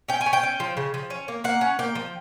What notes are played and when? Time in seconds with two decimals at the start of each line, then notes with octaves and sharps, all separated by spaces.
0.08 C#4 G5
0.21 G#5
0.26 C#4
0.33 G5
0.43 C#4
0.60 F3
0.77 C#3
0.94 F3
1.10 C#4
1.28 A#3
1.44 A#3 F#5
1.61 C#4
1.79 A#3 G5
1.95 F3